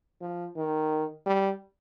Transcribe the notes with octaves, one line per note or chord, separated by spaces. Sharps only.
F3
D#3
G3